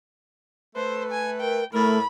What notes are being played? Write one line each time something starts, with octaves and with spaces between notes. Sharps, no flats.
A3 B4 C5
G#5
A#4 G5
A2 A3 A#4 B5